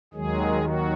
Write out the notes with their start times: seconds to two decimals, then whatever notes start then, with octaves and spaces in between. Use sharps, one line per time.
0.14 D#2 D#3 F#3 G#3 G#4
0.63 F#3 F#4